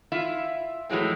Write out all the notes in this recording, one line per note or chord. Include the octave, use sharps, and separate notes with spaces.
E4 F4 E5
A2 E3 F#3 G#3 C4